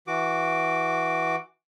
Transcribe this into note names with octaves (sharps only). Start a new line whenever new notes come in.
E3 F#4 D6